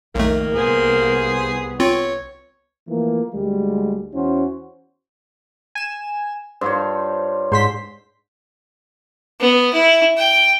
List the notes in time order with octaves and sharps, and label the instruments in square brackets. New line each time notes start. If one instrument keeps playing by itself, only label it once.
[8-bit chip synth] B1 A3 [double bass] F2 D#3 [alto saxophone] A#3
[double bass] C2 B3 [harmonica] G#4 C5
[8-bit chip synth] C4 F4 [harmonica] C#5
[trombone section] E3 F3 A3 A#3
D2 G3 G#3
E2 C#4 E4 F#4 C5
[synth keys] G#5 E7
[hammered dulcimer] G2 F4 C#5 [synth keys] C5
[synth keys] G#2 C6 B6 [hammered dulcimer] C5
[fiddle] B3
E4
G5